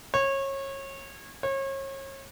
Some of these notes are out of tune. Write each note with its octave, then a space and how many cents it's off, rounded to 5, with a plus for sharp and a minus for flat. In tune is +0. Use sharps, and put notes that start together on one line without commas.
C#5 -25
C#5 -35